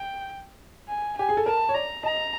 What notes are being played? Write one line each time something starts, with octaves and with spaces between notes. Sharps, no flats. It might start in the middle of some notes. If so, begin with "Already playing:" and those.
Already playing: G5
G#5
G4 G#5
G#4
A4
A#4 A5
C#5
D5 A#5
D#5 A#5